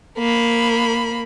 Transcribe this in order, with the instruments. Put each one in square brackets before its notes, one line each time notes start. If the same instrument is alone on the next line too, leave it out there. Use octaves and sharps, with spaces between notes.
[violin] A#3 B5